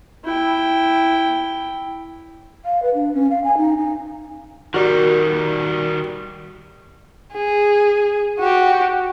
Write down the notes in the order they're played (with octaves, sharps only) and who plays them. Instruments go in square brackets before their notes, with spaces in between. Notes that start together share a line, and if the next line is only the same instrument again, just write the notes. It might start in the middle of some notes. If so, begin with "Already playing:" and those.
[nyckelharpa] E4 G5
[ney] F5
B4
D4
C#4
F5
G#5
D#4
D#4
[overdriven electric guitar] D#3 G3 [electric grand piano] F#4 [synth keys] G4 A#4 D5
[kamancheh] G#4
F#4 G4